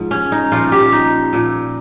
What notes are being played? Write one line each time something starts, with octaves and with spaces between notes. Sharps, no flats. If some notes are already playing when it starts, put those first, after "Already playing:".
Already playing: G#2 F3
C#4
D#4
A#2 F3 F4
G4
D#4
A#2 F3